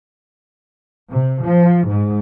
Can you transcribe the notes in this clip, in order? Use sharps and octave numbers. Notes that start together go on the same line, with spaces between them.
C3
F3
G#2